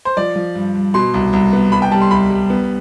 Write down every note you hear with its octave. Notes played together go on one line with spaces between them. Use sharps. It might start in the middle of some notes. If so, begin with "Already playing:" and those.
C5
F3 D5
F3
G2
G2
B2 C6
C2
C2
B3
C2 B5
G5
G3 A5
C6
C2 B5
G3
B3